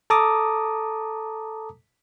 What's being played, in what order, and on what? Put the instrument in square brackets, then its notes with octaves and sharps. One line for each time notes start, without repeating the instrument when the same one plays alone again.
[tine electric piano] A4 A5 A#5 D6 D#6